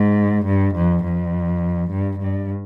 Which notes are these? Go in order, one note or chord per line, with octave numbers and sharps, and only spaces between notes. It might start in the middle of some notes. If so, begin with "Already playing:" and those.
Already playing: G#2
G2
F2
F2
G2
G2